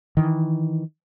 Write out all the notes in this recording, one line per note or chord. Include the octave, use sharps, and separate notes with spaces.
D#3 E3